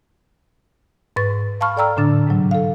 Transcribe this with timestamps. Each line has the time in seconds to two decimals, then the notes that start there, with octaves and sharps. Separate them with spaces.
1.16 G#2 B4 C#6 A6
1.61 F5 A5 B5 C#6 F6
1.77 A4 D5 G5 A#5 E6 F6
1.97 A2 D3 D4 A6
2.28 G#2 C3 F#3
2.51 A4 F5